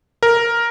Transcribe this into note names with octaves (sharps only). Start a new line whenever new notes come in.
A#4